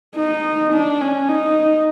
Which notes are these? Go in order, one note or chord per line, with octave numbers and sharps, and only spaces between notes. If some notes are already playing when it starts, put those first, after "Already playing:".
D#4
D4
C#4
D#4